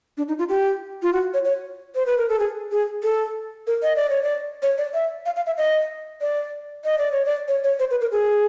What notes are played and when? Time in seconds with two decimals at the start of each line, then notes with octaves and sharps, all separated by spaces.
0.17 D4
0.28 D#4
0.39 F4
0.49 G4
1.02 F4
1.13 F#4
1.34 C#5
1.45 C#5
1.95 C5
2.06 B4
2.18 A#4
2.29 A4
2.39 G#4
2.72 G#4
3.03 A4
3.67 A#4
3.83 D#5
3.96 D5
4.10 C#5
4.23 D5
4.62 C#5
4.78 D5
4.94 E5
5.26 F5
5.36 F5
5.46 E5
5.58 D#5
6.21 D5
6.85 D#5
6.98 D5
7.12 C#5
7.25 D5
7.48 C#5
7.64 C#5
7.79 C5
7.91 B4
8.01 A#4
8.12 G#4